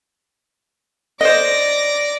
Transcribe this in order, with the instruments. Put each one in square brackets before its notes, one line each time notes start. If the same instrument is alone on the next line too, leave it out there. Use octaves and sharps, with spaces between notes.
[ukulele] C5 D#5 [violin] D5 A#6